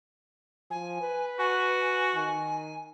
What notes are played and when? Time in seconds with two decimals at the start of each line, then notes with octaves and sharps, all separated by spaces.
0.71 F3 G#5
1.02 B4
1.39 F#4 G#5
2.15 D#3 G#5